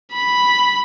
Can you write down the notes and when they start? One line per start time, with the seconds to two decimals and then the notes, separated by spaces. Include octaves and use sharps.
0.13 B5